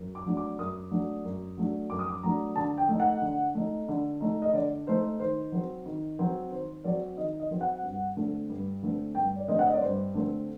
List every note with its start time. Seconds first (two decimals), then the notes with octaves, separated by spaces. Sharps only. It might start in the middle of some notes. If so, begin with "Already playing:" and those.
Already playing: F#2
0.15 D6
0.26 F#3 A3 D4
0.37 D6
0.59 F#2 D#6
0.91 F#3 A3 D4
1.25 F#2
1.58 F#3 A3 D4
1.90 F#2 D6
1.99 D#6
2.08 D6
2.23 F#3 A3 D4 A#5
2.56 D3 A5
2.78 G5
2.89 A3 D#4
3.00 F#5
3.22 D3
3.55 A3 D#4
3.88 D3
4.21 A3 D#4
4.42 D#5
4.53 D3 D5
4.87 A3 D#4 C5
5.19 D#3 C5
5.52 F#3 C4
5.86 D#3
6.19 F#3 C4
6.51 D#3 C5
6.84 F#3 C4 D5
7.17 D#3 D#5
7.40 D#5
7.51 F#3 C4
7.61 F#5
7.83 G2
8.17 D3 A3 C4
8.50 G2
8.83 D3 A3 C4
9.15 G2 G5
9.36 D5
9.48 D3 A3 C4 D#5
9.59 F#5
9.66 D#5
9.74 D5
9.81 G2 C5
10.14 D3 A3 C4